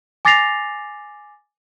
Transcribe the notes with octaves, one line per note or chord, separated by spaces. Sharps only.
G#5 D6 A6 A#6 C7 F7